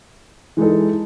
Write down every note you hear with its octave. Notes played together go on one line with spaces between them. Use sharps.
E3 G#3 D#4 A4